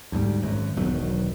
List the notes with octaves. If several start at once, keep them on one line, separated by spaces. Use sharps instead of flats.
D2 G#2 G3
G#1 F#2
E1 B1 D#3 F#3